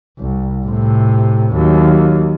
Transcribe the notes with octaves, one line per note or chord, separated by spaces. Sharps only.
C2
A2 C3
D#2 F#3